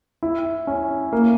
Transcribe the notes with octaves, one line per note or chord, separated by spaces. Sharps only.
E4
C#4
A#3